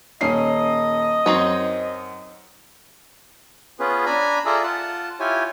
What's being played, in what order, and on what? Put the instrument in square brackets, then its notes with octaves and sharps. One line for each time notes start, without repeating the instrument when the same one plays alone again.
[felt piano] D#1 C#4 C7 [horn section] D#5
[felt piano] F#2 [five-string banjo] C4 D#4 C#5
[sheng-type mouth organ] B3 C#4 F4 G#4 B4
D4 G#5 A#5 B5
F4 G#4 A4 D5 E5 A#5
F4 F#5 A5
E4 F4 G4 C#5 G#5